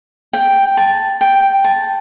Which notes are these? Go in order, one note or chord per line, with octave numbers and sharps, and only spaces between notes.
G5
A5
G5
A5